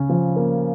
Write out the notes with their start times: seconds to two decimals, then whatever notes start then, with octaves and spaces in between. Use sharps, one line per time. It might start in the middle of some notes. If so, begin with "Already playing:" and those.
Already playing: C#3 C#4
0.09 F3
0.36 A#3